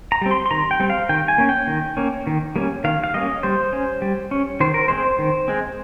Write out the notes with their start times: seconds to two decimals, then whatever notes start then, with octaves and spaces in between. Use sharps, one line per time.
0.12 A#5
0.22 G3 C4
0.31 C6
0.46 C6
0.51 D#3 A#5
0.71 G5
0.80 G3 C4
0.90 F5
1.09 D#3 G5
1.28 G#5
1.38 A#3 C#4
1.49 G5
1.67 D#3
1.97 A#3 C#4
2.27 D#3
2.56 G3 A#3 C#4
2.84 D#3 F5
3.04 F5
3.14 G3 A#3 C#4 D#5
3.43 G3 C5
3.73 C#4
4.02 G3
4.31 C#4
4.60 D#3 C5
4.74 A#4
4.88 G#3 C4 C5
5.19 D#3
5.48 G#3 C4